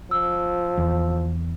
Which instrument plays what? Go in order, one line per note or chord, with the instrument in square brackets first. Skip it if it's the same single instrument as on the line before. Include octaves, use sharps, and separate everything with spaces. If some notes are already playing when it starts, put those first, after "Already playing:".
[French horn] F3 [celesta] E6
[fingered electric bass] E2